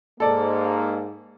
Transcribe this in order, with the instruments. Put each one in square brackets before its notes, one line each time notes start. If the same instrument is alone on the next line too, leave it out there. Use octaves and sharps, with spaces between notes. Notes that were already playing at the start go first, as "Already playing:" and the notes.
[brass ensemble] G#2 A#3 [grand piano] A4 D5